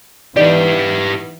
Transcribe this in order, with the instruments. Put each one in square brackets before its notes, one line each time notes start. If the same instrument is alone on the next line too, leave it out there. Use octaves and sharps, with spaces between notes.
[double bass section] E3 [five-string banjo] B3 D#4 D5 [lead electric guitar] G4 B4